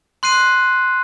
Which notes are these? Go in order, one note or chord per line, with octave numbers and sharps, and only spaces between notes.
C6 F#6 C7 D#7